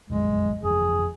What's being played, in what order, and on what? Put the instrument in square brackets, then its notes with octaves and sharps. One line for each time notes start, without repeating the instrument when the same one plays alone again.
[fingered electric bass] F1 A#1 F#2 [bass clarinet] G#3
[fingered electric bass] G1 F2 E3 [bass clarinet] G#4